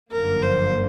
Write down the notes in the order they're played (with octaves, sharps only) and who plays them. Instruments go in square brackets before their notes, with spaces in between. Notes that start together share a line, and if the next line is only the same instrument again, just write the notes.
[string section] G1 F#2 D3 F3 A#3 [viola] A#4
[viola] C5